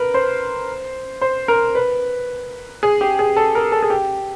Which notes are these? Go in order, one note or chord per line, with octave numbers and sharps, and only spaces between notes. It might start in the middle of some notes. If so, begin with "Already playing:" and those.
Already playing: A#4 B4
C5
C5
A#4
B4
G#4
G4
G#4
A4
A#4
A4
G#4
G4